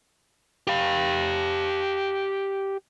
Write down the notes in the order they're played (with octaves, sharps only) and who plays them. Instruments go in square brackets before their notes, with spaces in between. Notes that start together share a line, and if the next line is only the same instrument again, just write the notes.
[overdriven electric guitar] G4 F5